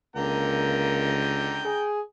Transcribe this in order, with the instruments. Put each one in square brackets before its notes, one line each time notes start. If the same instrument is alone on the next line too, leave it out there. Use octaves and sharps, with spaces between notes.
[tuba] C#2 [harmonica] D3 G5 A#5 [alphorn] A#3
[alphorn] G#4